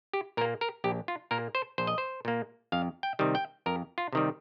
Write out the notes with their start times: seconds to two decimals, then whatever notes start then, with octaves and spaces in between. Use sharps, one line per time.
0.14 G4
0.37 A#2 A#4
0.41 A#3
0.61 A#4
0.84 A#1 G4
1.08 F4
1.31 A#2 A#3 A#4
1.55 C5
1.78 A#1 C5
1.87 D#5
1.98 C5
2.25 A#2 A#3
2.72 F2 F5
3.03 G5
3.19 C3 D#3 G3
3.35 G5
3.66 F2 A#4
3.98 F4
4.13 C3 D#3 G3